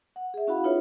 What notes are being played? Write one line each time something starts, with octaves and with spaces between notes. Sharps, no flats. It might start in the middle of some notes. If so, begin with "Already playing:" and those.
F#5
G#4 E5
C#4 E4 F#4 F5 F#5 B5
D#4 F4 G#4 B4 C#5 E5